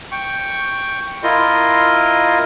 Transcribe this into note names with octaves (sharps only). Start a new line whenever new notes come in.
G5 C#6
E4 F4 A#4 D#5 C6